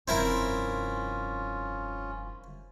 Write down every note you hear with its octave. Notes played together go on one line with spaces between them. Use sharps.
F1 G2 C4 C#4 E4 F4 A#4